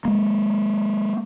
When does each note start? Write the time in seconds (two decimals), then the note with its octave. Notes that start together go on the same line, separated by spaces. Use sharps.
0.05 G#3 A#3